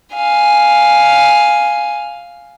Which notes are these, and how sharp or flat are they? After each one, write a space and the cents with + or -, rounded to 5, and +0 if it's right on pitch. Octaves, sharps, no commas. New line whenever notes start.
F5 +0 G#5 +0